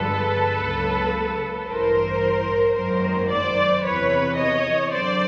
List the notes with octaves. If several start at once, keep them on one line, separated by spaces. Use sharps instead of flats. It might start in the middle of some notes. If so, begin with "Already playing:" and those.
Already playing: G1 G2 D3 F3 G#3 A4 B4
C#2 C#3 F#3 A#3
A1 G2 E3 A#4 C5
G#1 F#2 D#3 F#3 A#3 A#4 C5
C5 D5
E2 C3 E3 B4 C#5
C#5 D#5
F#2 D3 F#3 C5 D5